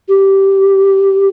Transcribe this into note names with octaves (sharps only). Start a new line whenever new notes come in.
G4